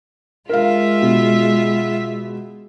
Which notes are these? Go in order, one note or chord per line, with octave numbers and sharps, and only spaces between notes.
G#3 F4 A#4 E5 F5
B2